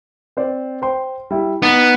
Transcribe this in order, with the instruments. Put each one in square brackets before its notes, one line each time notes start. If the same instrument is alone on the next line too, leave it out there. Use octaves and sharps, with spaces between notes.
[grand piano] C4 C5 D5
C5 G5 C6
G3 E4
[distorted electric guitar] B3 [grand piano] D#4 A6